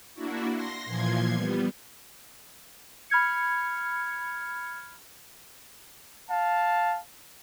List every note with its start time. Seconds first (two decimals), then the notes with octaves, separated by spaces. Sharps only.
0.14 A#3 D4 E4 F#4
0.53 C6 A#6
0.85 A#2 E3 F3 C6 G#6
1.32 G3 B3
3.10 B5 F6 G#6 C#7
6.30 F5 A5